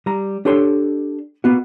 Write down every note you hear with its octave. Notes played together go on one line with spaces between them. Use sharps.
G3 A#5
D4 G4 A4 C#5 C6
A#3 B3 F#4